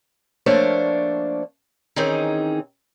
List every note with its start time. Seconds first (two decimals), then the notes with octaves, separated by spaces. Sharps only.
0.46 F3 A3 A#3 D4 C5 C#5
1.96 D#3 E3 C4 C#4 D#4 G#4